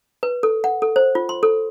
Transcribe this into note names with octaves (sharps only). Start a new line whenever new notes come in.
B4
A4
F#5
A4
C5
F4
C6
A4